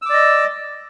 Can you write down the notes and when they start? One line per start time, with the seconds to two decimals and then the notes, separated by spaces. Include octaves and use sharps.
0.02 E6
0.06 D6
0.10 D5
0.14 D#5